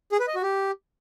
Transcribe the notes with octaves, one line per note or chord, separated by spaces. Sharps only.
G#4
B4
D#5
F#4
G4